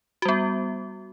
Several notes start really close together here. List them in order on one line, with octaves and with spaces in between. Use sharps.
F#4 G3 B3